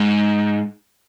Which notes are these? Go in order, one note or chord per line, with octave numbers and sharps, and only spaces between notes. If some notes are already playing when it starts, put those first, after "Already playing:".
Already playing: G#2